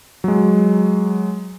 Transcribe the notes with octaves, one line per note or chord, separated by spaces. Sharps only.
F#3 G#3